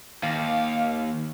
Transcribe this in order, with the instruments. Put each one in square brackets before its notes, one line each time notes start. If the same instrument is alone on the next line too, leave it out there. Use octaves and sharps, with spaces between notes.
[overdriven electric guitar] D#2 [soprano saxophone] F5